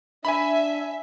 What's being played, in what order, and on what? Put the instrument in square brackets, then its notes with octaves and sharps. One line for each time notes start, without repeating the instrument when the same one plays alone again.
[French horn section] D4 [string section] E5 [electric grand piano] G#5 B5